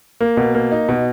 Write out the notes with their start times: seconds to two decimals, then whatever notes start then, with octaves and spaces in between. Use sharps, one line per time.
0.21 A#3
0.37 B2
0.55 A#3
0.72 D#4
0.89 B2